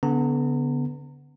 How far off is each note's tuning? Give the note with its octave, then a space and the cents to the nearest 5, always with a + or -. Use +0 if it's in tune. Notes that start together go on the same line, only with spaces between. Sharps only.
D3 -35 B3 +0 A#5 -35